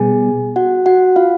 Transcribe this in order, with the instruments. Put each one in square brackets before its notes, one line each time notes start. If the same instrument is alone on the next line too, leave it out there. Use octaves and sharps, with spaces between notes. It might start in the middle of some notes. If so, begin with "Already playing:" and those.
Already playing: [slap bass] B2 G3 B3 [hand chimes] G#4 G#5
[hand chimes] F#4 F#5
F#4 F#5
F4 F5